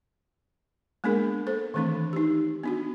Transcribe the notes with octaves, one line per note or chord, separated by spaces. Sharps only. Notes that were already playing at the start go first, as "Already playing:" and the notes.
G#3 A#3 B3 D4 G#4 A#4
A4 C5
D#3 E3 A3 C4 D4
D#4 G4
B3 D4 F#4